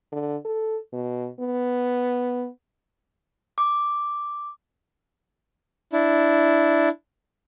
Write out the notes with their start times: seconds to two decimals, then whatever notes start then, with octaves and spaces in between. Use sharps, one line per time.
0.12 D3
0.45 A4
0.93 B2
1.40 B3
3.58 D6
5.93 D4 E4